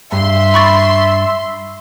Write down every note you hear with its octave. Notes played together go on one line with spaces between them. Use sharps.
G2 E5 C6
B5 C#6 A6